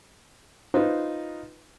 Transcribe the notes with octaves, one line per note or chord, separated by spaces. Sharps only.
D#4 F4 B4 C5